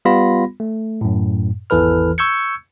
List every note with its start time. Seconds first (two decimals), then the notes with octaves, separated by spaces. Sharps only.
0.05 G3 B3 F4 B5 A#6
0.60 A3
1.01 F#2 A2
1.70 G#1 E2 E3 A4 B4 F6
2.18 C#6 E6 G6 G#6 C#7